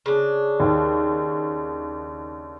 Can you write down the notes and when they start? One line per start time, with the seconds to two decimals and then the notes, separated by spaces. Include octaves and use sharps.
0.06 C#3 D4
0.60 D#2